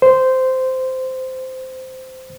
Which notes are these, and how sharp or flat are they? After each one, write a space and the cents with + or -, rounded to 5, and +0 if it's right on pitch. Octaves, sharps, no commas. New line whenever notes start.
C5 -10